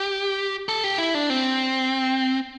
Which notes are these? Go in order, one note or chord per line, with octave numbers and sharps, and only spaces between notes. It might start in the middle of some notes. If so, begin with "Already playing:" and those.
Already playing: G4
A4
G4
E4
D4
C4